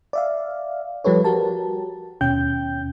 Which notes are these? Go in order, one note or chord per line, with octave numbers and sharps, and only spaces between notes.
D5 E5 F5
F3 G3 G4 A4 B4 C#5
F#4 G4 A#4 A5
D#2 B2 C#4 G5 G6